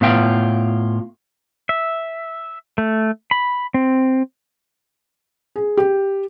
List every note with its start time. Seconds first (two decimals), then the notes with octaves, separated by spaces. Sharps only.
0.01 A2 B3 F4 G5
1.69 E5
2.78 A3
3.31 B5
3.74 C4
5.56 G#4
5.77 G4